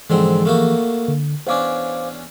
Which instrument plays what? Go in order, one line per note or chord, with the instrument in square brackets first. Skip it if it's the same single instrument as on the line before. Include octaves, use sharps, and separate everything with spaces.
[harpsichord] G#2 D3 C4 [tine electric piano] E3 F3 G#4
[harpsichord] A3 A#3 F#4
[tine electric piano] D3
[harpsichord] E2 C#4 D4 [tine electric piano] C5 F5 D6